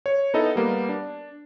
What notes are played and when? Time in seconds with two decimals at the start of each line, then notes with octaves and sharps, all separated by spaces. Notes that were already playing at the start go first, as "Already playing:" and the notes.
0.06 C#5
0.34 B3 D#4 E4 A4 D#5
0.56 G3 A#3 B3
0.89 D4